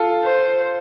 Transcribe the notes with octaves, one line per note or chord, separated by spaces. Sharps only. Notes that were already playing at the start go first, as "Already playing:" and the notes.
Already playing: F4 A4
C5